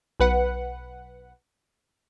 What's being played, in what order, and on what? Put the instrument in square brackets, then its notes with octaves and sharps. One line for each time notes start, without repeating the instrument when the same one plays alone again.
[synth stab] B1 B4 F#5